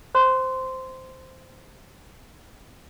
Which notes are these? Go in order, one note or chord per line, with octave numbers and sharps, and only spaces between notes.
C5 C6